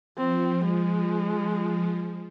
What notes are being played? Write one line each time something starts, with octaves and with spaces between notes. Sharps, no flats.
F3 C4
G#3